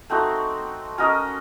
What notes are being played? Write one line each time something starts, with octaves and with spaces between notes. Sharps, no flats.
A3 C4 D#4 F#4
C#4 F#4 A#4 D#5